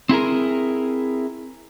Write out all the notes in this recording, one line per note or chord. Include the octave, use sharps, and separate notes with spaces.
C4 E4 G#4 A#4